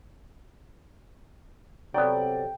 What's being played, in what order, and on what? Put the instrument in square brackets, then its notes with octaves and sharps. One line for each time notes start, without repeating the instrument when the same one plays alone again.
[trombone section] C3 A4 [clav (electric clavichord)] F#3 B3 [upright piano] D5 [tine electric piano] G5